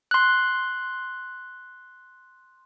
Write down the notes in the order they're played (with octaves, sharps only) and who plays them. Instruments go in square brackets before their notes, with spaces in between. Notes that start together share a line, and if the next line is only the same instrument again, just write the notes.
[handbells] C6 F#6